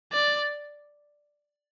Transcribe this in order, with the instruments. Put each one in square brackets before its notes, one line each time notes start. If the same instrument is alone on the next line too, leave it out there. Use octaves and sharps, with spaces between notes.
[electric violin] D5